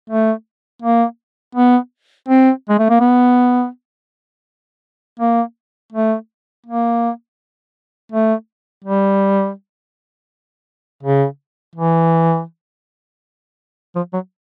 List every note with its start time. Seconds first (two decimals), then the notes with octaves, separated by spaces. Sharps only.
0.10 A3
0.82 A#3
1.55 B3
2.28 C4
2.69 G#3
2.79 A3
2.89 A#3
3.00 B3
5.19 A#3
5.92 A3
6.66 A#3
8.12 A3
8.84 G3
11.03 C#3
11.75 E3
13.95 F3
14.13 F#3